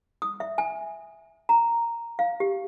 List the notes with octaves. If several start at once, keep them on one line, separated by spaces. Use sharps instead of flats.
D#6
E5
G#5
A#5
F5
G4